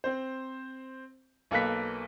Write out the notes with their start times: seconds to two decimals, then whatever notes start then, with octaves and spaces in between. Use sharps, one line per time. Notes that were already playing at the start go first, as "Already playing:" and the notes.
0.04 C4 C5
1.51 B1 A#3 A4 B4 F#6 B6